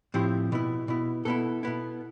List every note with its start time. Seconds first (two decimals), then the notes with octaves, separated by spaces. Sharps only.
0.14 A2 F3 C4 E4 G4
0.52 B2 B3 E4
0.88 B2 B3 E4
1.25 B2 B3 E4 A4
1.63 B2 B3 E4